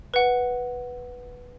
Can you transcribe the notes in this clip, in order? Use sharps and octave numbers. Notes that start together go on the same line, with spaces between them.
B4 F#5